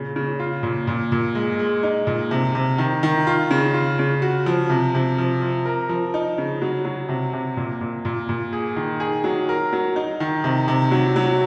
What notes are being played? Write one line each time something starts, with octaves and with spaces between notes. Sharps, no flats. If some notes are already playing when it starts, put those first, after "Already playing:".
Already playing: A#2 C#3
C#3
F4
A#2
A#2
A#2
G#3
G#3
D#4
A#2
C3
C3
D#3
D#3
F4
C#3
F4
C#3
F#4
F3
C3
C3
F3
F3
A#4
F3
D#4
C#3
F#3
F#3
C3
C3
A#2
A#2
A#2
A#2
G#4
D#3
G#4
F#3
A#4
F#3
D#4
D#3
C3
C3
F#3
F#3